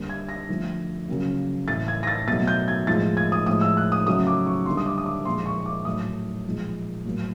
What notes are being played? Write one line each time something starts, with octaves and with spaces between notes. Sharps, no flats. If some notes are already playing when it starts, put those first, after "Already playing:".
Already playing: D3 G3 A#3
G#6
A#6
D3 F3 A3
C#3 F#3 A#3
A2 E3 A3 A6
G#6
A#6
A6
B2 F#3 A3 A6
G6
G#6
A2 F3 G#3 A6
G#6
D#6
A2 F3 G#3 D#6
E6
F#6
D#6
C#3 F#3 A3 D#6
D6
C#6
D3 G3 A#3 C6
D#6
D6
D#6
D6
A#2 F3 G#3 C6
C#6
D6
A2 F#3 A3 D#6
A#2 F3 G#3
A2 F#3 A#3